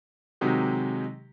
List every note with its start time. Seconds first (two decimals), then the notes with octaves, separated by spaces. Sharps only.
0.41 C3 D#3 F#3 G#3 D#4 G4